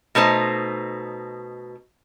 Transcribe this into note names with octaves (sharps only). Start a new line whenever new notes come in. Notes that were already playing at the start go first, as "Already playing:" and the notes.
B2 A3 D#4 C5